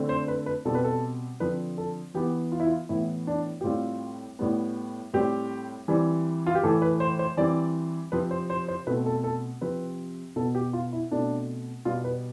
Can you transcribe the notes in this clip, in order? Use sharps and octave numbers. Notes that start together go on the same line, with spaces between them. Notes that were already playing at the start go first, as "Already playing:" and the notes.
Already playing: D3 A3 C4
C5
B4
B4
B2 G3 C4 A4
B4
A4
D3 F3 C4 B4
A4
E3 B3 G4
F4
E4
F4
A2 E3 B3 E4
D4
G4
A2 G3 C4 F4
A2 G3 B3
A2 G3 C4 G4
E3 G3 C4
F4
G4
A2 E3 A3 A4
B4
C5
C5
E3 G3 C4 D5
C3 F3 C4 B4
C5
C5
C5
B2 A3 C4 B4
A4
A4
C3 F3 C4 B4
B2 B3 A4
G4
F4
E4
B2 A3 C4 D4
B2 G3 B3 F4
B4